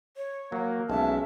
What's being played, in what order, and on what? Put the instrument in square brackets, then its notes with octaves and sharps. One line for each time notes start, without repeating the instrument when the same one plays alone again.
[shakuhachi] C#5
[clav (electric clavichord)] F#3 [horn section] A#3
[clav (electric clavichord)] B1 [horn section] G#3 C#4 [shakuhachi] E5 [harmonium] A5